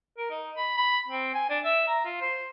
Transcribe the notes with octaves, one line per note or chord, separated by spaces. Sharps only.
A#4
D#4
B5
B5
C4
G#5
D4
E5
A#5
F4
C5